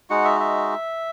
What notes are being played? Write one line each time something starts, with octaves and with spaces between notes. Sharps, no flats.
G#3 D#4 F#4 F#5
E5
E5